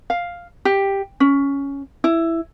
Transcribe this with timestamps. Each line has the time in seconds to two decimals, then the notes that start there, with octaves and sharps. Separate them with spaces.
0.10 F5
0.65 G4
1.20 C#4
2.04 E4